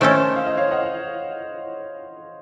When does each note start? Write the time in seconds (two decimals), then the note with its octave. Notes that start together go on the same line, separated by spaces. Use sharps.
0.01 D#3 A3 C#4 A4 C5 D#5
0.36 F5
0.47 D#5
0.57 C#5 F5
0.71 D#5 F#5